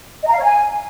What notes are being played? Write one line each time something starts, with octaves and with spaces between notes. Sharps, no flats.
D#5
A#5
F5
C#5
G#5